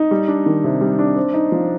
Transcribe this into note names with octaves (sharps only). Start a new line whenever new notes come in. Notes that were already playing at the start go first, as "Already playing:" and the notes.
Already playing: D#4
G3
D4
D#3
C3
G3
D4
C4
D#4
F3